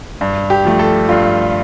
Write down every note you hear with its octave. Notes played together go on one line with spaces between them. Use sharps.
G2
G4
F3 A3
A4
G2 F4